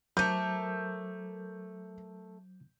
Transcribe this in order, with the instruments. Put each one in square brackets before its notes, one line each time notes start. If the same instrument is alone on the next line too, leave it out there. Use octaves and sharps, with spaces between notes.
[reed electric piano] F#3 C5 D6 [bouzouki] A3 A#4 [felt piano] G6